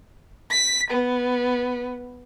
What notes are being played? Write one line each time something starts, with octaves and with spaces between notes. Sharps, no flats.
B6
B3